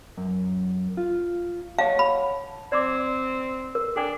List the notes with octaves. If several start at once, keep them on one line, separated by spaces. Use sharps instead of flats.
F#2
F4
C#5 F5 F#5 A5
B5
C4 D5 C6 D6
A#4
D4 A4 G5 G#5